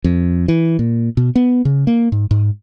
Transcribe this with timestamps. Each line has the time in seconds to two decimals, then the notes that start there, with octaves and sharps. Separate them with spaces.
0.04 F2
0.48 E3
0.79 A#2
1.17 B2
1.36 B3
1.65 C#3
1.87 A#3
2.12 G#2
2.31 G#2